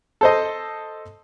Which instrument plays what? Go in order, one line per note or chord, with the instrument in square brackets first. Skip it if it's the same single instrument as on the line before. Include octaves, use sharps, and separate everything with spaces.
[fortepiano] A4 C5 D#5